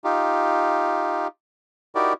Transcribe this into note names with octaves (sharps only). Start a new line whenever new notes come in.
D#4 F4 G4
D#4 E4 F#4 G4 A#4 D5